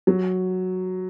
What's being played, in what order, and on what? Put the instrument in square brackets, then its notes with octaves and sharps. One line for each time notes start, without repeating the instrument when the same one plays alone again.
[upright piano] F#3